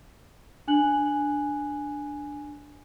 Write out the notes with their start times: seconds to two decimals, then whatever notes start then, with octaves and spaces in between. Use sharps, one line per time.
0.68 D4 G#5 F#6 F#7